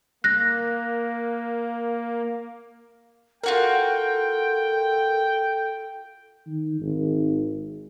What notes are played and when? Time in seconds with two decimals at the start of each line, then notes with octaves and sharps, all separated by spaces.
0.24 A#3 F#6 A#6
3.44 F4 F#4 A4 A#4 F#5 G5
6.47 D#3
6.80 G#1